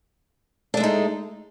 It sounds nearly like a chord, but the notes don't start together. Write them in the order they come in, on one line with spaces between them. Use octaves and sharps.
D4 A3 G#3 D#4